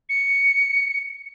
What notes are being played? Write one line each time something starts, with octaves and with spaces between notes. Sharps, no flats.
C#7